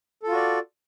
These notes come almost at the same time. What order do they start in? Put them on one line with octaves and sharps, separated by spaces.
A4 F4 F#4 D5